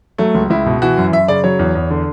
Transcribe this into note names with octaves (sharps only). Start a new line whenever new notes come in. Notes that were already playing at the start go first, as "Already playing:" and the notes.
F#3 A3
C#2
C#2 E4
B2
E3 F#4
F#2
F#2 E5
C#3 D5
F#3 C#5
E2
E2
D3